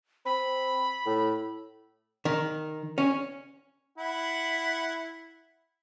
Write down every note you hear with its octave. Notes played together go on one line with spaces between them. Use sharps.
C4 B5
A2
D#3
C#4
E4 F#5